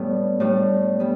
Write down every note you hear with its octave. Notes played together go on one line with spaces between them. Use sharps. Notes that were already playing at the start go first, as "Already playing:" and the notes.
Already playing: A2 G3 B3 D4
A2 G3 D4
G3 B3